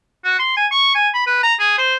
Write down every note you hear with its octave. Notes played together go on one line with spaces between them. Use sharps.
F#4
C6
G#5
C#6
G#5
B5
B4
A#5
G#4
C5